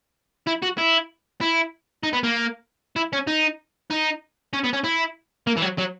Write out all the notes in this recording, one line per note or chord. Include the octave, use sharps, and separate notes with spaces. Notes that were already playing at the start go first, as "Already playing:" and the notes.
E4
F#4
E4
E4
D#4
B3
A#3
E4
C#4
D#4
D#4
C#4
B3
C#4
E4
A#3
E3
F#3
F#3